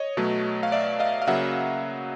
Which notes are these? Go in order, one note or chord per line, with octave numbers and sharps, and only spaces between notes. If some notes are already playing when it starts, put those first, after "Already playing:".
Already playing: C#5 D#5
B2 F#3 A3
F5
D5 E5
D#5 F5
F5
C#3 F#3 A#3 E5 F#5